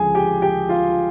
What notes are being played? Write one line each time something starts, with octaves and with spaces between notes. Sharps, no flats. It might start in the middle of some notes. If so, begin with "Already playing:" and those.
Already playing: D2 C#3 F3 G#3 G#4 G#5
G4 G5
G4 G5
F4 F5